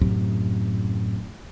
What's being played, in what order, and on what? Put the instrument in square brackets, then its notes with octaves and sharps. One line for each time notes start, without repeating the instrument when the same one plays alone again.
[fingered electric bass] F#2 A2 C3